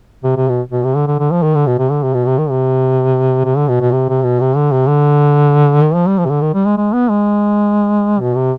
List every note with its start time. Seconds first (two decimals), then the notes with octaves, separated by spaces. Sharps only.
0.24 C3
0.36 C3
0.49 B2
0.71 B2
0.84 C3
0.95 D3
1.07 D3
1.19 D3
1.31 F3
1.43 D#3
1.55 D3
1.67 B2
1.78 C3
1.90 D3
2.03 C3
2.14 B2
2.26 C3
2.38 D#3
2.49 C3
3.45 C3
3.56 D3
3.68 B2
3.80 B2
3.92 C3
4.09 C3
4.23 B2
4.40 C3
4.56 D3
4.72 C3
4.87 D3
5.82 D#3
5.94 F3
6.07 G3
6.18 F3
6.25 C3
6.30 D3
6.41 D#3
6.54 G3
6.65 G#3
6.77 G#3
6.93 B3
7.09 G#3
8.20 B2
8.35 C3